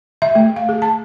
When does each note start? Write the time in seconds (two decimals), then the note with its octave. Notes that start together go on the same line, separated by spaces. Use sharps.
0.22 E5
0.35 A3
0.56 F5
0.69 G#4
0.82 A5